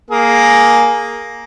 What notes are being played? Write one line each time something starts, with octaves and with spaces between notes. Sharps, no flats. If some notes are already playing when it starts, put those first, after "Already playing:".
A#3 G#4